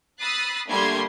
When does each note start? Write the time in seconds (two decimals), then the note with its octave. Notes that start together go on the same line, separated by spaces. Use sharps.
0.21 B5 D#6 E6 F#6 A6 C7
0.69 D3 G3 A3 A#3 C6 G#6